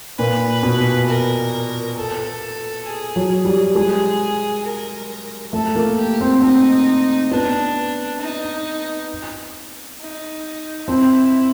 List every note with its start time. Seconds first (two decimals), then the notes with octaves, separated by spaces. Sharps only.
0.18 A#2 B4
0.63 B2
1.07 A#4
1.97 A4
2.86 G#4
3.16 F#3
3.45 G3
3.75 G#3 G#4
4.65 A#4
5.53 A3 A4
5.76 A#3
5.98 G4
6.21 C4
6.42 C4 D#4
7.31 B3 D4
8.21 D#4
10.00 D#4
10.88 C4 E4